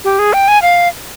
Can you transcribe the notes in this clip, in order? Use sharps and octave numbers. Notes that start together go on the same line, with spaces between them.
G4
G#4
G5
G#5
F5